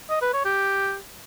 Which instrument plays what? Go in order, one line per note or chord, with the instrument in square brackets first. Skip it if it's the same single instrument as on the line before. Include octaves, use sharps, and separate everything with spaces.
[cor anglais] D#5
B4
C#5
G4